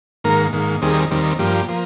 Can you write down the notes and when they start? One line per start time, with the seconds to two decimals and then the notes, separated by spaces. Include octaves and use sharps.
0.24 G#2 D#3 A#3 A#4
0.52 G#2 D#3 A#3
0.82 D#2 D#3 G3 C4 G#4
1.11 D#2 D#3 G3 C4
1.39 G2 F3 A#3 G4
1.68 F3 A#3